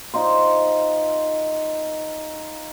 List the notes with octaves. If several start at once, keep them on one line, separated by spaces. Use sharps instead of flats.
D#4 F4 C5